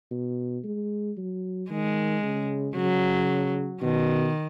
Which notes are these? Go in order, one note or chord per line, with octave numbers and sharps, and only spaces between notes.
B2
G#3
F#3
D#3 G#3
C#3
C#3 F#3
B2 D#3